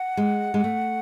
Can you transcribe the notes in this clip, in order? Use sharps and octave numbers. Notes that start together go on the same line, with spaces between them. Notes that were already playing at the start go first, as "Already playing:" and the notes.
Already playing: F#5
G#3
G#3
A3